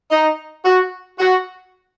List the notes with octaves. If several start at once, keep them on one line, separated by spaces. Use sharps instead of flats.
D#4
F#4
F#4